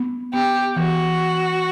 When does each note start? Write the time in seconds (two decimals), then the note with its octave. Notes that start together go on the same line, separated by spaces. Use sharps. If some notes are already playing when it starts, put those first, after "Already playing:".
Already playing: B3
0.33 B3 G4
0.76 E3 F#4